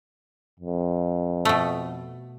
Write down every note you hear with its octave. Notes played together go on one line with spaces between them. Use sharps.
F2
B2 A3